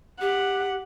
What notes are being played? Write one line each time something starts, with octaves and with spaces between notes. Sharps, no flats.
G4 F#5